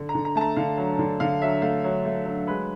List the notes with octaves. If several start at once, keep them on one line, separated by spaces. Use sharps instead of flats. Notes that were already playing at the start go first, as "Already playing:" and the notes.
Already playing: D3
A#5
D3
A#5
A3 A5
A#5
D3 F5
F#3
D3
D3 F5
F#3 E5
A3 F5
F#3
A3
F#3
G#3 B4